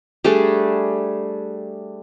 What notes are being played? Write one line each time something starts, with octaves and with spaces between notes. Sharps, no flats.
G3 A3 D4 G#4